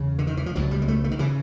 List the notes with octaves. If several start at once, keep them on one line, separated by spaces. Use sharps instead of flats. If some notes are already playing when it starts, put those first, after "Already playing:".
Already playing: E2 C#3
D3
D#3
E3
F3
C#2 B2 F#3
G3
G#3
A3
A3
D#3
C#3 E3